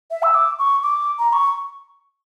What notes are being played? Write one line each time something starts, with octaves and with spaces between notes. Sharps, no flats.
E5
E6
D6
C#6
D6
A#5
C#6